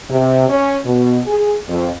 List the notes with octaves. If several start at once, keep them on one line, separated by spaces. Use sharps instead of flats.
C3
C#4
B2
G#4
F2